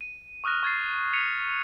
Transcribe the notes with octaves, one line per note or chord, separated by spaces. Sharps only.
D#7
C#6 D#6 F6 F#6 A#6
C#6 G#6 A6 C7
G#6 B6 C#7 D#7 F7